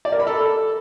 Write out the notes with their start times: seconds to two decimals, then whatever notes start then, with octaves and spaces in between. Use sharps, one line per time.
0.05 D5
0.12 A#4
0.20 B5
0.27 A4